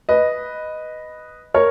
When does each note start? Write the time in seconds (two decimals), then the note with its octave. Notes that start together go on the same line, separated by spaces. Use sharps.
0.09 B4 D#5
1.54 A#4 C#5